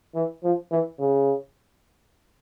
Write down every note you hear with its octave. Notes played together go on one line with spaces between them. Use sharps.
E3
F3
E3
C#3